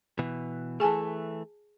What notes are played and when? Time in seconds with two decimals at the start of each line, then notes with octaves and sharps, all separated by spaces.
0.19 B2 E3
0.80 E3 A3 G#4 G#5 A5